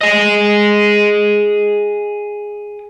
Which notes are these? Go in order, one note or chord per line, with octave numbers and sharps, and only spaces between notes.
G#4 D#5